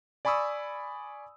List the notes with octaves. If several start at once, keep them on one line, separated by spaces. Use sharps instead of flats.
D5 G#5 B5 C#6 D#6 E6